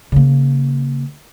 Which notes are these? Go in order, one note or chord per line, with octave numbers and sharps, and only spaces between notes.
C#3 A#3